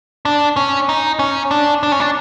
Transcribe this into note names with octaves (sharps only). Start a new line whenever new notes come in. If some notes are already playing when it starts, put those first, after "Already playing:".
D4
C#4
D#4
C#4
D4
D4
C#4
D4